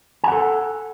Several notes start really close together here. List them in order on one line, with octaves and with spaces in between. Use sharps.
G#5 F#5 A4